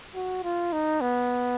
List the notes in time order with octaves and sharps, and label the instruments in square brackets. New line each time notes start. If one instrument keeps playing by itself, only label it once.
[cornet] F#4
F4
D#4
B3